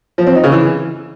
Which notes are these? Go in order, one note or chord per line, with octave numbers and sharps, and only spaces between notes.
F3
C4
D#4
C#3
E3